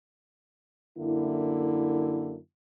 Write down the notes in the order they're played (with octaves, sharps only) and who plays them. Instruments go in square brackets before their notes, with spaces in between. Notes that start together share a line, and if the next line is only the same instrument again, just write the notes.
[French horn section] F#2 D3 A#3 E4